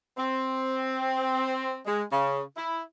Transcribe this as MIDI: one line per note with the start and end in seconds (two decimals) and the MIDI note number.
0.17 1.79 60
1.86 2.02 56
2.11 2.41 49
2.57 2.81 64